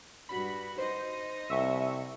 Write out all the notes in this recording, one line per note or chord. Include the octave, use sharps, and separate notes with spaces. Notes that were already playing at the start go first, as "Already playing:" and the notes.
G2 F#4 B5
D#4 C5 D#5
C2 E5 C#6